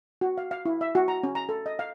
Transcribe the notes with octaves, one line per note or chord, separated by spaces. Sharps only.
F#4
F5
F5
E4
E5
F#4
A#5
C#4
A#5
A4
D#5
F5